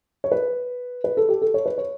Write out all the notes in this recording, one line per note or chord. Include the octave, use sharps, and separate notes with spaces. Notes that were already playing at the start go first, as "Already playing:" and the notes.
C#5
B4
B4
A4
G4
A4
C#5
B4
C#5